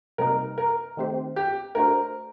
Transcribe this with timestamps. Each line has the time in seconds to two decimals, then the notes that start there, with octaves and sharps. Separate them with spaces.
0.18 C3 G3 A#3 D#4 A#4
0.58 A#4
0.97 D#3 A3 C4 G4 C5
1.36 G4
1.75 A3 D4 F#4 A#4 C5